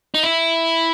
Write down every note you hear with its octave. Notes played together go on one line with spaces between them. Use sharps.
D#4
E4